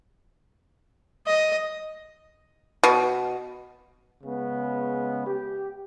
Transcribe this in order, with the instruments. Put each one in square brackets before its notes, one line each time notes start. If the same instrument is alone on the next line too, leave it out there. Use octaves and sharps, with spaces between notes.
[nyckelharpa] D#5
[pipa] B2
[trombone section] C#3 G#3 B3
G4